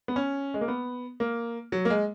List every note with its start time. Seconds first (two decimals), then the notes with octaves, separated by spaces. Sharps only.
0.08 B3
0.16 C#4
0.54 G#3
0.61 A#3
0.68 B3
1.20 A#3
1.72 F#3
1.85 A#3
1.90 G#3